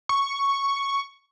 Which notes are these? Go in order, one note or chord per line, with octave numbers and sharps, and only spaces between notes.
C#6